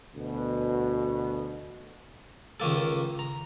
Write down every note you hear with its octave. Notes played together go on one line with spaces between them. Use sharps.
D2 B2
C#2 D#3 A#3 A4
A#5